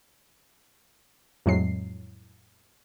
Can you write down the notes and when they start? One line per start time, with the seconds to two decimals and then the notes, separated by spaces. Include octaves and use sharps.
1.46 F2 A2 F#3 G#3 C7